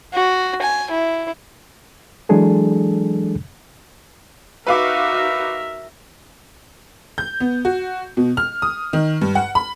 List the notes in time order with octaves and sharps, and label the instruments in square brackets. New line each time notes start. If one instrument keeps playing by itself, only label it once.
[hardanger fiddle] F#4
G#5
E4
[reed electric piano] E3 F#3 G#3 D4 G#4 A4
[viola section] D#4 F#4 [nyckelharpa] A#4 E5 [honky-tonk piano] B4 F5 D6
[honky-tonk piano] G6
B3
F#4
B2
F6
D#6
D#3
G2
F#5
B5